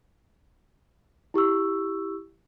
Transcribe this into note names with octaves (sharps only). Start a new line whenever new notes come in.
E4 G4 C#6 E6